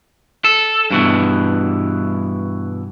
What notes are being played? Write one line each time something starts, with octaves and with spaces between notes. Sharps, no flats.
A4
G2 B2 E3